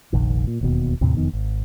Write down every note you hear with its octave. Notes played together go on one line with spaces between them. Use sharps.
F1 A#1 D#3
A#2
E1 D#2 B2
D#2 A2 C3
E1 F2 D#3 B3
G#1